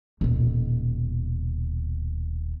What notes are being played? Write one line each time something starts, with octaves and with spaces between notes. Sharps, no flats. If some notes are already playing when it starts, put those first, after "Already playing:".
D#1 B2